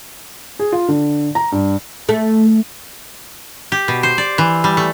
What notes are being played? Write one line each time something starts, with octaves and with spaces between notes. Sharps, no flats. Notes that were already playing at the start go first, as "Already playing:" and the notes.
G#4
F4
D3
A#5
G2
A3
G4
B2
C5
D5
E3
G3
A3